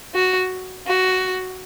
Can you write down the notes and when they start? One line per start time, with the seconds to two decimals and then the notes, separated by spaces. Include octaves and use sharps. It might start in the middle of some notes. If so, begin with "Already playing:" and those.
0.14 F#4
0.87 F#4